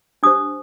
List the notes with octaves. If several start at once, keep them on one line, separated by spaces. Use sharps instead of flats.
D4 G4 C5 D#6